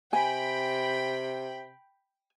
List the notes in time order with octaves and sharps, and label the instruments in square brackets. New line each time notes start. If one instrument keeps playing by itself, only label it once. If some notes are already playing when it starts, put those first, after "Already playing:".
[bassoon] C3 [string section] G5 B5 [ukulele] G#5